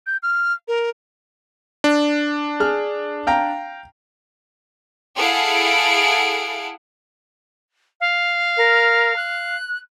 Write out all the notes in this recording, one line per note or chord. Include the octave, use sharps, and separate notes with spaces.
G6
F6
A#4
D4
G#4 F6
F5 G5 A#5
E4 G#4 A4 F5 F#5 D7
F5
A#4
F#6